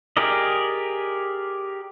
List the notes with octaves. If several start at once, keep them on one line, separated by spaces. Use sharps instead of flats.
G4 G#4 A#4 D5 D#5